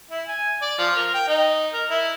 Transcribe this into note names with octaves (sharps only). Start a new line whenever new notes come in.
E4
G#5
D5
F3
A#4
G5
D#4
A#4
E4